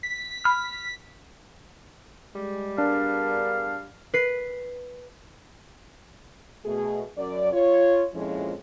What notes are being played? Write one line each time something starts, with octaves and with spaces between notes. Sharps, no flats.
B6
B5 F6
G3 G#3
B3 D4 G#4 A#4 F5
B4 C7
B2 A3 G#4
F#2 D5
F4 C#5
F2 A#2 F3 G#3 C#4 E4